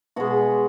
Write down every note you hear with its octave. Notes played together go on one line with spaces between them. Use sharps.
B2 G#3 F#4